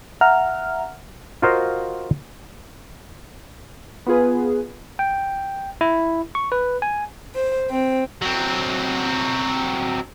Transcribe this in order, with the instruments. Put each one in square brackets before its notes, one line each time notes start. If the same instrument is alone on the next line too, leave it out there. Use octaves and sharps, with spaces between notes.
[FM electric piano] E5 F#5 A#5 F6
[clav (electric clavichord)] F4 F#4 A#4 C5 D#5 F5
[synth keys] B3 F4 G#4 B4
[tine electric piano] G5
E4
C#6
B4
G#5
[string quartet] C5
C4
[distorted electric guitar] F#3 C4